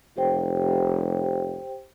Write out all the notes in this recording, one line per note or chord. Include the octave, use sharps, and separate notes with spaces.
F1 G4 C5 G5